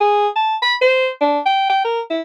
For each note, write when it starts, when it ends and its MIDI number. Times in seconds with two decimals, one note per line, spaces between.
0.01 0.28 68
0.36 0.56 81
0.62 0.74 83
0.81 1.09 72
1.21 1.39 62
1.46 1.65 79
1.70 1.80 79
1.85 2.00 70
2.10 2.21 64